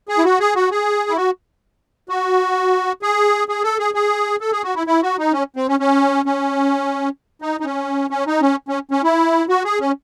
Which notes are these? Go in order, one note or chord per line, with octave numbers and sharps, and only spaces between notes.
G#4
E4
F#4
G#4
F#4
G#4
E4
F#4
F#4
G#4
G#4
A4
G#4
G#4
A4
G#4
F#4
E4
E4
F#4
D#4
C#4
C4
C#4
C#4
C#4
D#4
D#4
C#4
C#4
D#4
C#4
C#4
C#4
E4
F#4
G#4
C#4